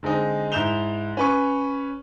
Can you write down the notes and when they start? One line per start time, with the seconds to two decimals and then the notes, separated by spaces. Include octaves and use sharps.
0.03 D3 G#3 C4 D#4
0.52 G#2 E4 G6 E7 F7 G7
1.17 C#4 B4 C#6